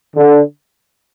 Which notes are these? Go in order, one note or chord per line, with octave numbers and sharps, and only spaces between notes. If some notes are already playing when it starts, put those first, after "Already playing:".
D3